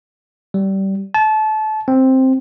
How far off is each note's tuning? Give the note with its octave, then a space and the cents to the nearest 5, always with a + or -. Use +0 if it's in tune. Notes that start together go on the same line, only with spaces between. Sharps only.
G3 -20
A5 -25
C4 +5